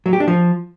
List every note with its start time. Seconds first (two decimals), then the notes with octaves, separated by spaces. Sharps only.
0.06 F#3
0.13 G4
0.20 D4
0.28 F3